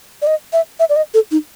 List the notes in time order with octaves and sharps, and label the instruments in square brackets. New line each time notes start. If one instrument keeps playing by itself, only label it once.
[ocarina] D5
D#5
E5
E5
D5
D#5
A4
D#4